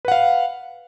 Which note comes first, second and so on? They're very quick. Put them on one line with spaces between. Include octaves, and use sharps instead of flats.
B4 F#5 F5